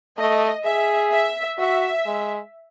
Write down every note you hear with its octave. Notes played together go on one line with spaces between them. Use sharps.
A3 D#5
G#4 E5
E5
F#4 E5
G#3